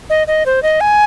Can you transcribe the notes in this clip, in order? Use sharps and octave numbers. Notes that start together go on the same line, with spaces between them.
D#5
D#5
C5
D#5
G#5